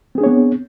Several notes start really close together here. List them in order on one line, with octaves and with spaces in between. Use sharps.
C4 G#4 D4 C#5 B3